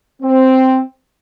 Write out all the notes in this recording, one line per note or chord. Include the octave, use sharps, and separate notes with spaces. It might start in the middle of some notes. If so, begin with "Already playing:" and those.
C4